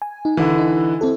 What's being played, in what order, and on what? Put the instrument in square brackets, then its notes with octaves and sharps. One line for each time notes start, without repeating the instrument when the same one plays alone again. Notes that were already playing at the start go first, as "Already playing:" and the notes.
[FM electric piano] G#5
D#4
[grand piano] D3 E3
[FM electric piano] D#4
C4 E4 A4